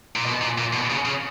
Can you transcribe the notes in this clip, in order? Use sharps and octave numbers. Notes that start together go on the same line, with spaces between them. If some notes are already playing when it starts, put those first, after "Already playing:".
A#2
B2
A#2
A#2
B2
C#3
C#3